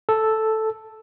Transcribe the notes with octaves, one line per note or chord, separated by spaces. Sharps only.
A4